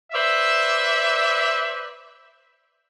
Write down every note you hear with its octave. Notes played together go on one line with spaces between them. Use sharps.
B4 C5 D5 E5